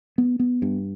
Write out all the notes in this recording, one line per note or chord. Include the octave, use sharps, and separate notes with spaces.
B3
B3
G2